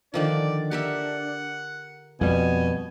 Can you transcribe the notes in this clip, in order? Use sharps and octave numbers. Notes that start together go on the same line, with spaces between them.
D3 D#3 F3 D4 D5
G4 A#4 E5 F#5
F2 B2 G3 G#5